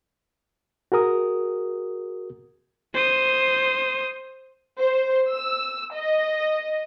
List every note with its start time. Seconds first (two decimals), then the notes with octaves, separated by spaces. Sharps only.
0.92 F#4 G#4 A#4 D#6
2.94 C5 D#6
4.79 C5
5.30 E6
5.94 D#5